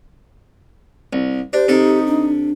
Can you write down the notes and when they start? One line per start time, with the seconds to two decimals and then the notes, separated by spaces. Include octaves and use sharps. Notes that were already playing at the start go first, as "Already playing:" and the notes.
1.13 C2
1.53 D4 G4 C5
1.68 C3 D#4 A4
2.07 D4